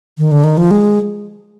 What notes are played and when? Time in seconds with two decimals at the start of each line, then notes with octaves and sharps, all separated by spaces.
0.18 D#3
0.32 D3
0.44 D#3
0.57 F3
0.71 G#3